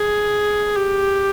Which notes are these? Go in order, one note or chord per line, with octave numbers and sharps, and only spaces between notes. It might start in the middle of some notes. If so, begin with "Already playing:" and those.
Already playing: G#4
G4